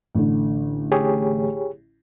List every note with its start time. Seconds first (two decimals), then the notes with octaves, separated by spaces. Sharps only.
0.15 A1 D3
0.92 G4 G#4 C#5